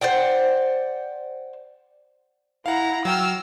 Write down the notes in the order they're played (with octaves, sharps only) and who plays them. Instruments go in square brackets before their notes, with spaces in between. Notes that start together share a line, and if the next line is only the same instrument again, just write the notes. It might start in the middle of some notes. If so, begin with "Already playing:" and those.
[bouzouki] C5 D5 F#5 G5
[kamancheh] E4 A#5 [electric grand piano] F5 F#5
[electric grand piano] F#3 G5 [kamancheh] E6 F6